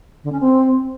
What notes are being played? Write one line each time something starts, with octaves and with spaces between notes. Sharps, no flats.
D3
C#4
C4